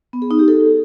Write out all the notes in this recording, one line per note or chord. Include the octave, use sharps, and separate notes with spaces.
B3
G#4
D#4
G4
A4